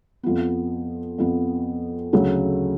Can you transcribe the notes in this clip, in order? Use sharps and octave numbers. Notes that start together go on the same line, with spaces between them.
F2 F3 B3
F2 F3 B3
D2 C#3 F#3 A3